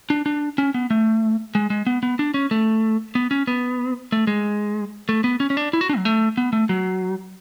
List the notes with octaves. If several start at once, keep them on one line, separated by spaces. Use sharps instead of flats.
D4
D4
C#4
B3
A3
G#3
G#3
B3
B3
D4
C#4
A3
B3
C#4
B3
A3
G#3
A3
B3
C#4
C#4
D4
E4
F#4
D4
F#3
A3
B3
A3
F#3